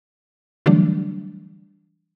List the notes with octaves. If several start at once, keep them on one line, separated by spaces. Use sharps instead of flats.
D3 E3 F#3 G3 A3 D4